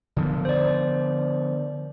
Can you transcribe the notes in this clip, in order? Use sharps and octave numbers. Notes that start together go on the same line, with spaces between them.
D3 F3 B3
C5 D5